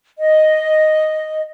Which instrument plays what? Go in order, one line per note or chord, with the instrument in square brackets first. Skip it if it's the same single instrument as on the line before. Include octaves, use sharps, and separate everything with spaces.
[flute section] D#5